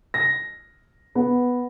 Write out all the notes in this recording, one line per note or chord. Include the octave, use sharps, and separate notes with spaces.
A#6
B3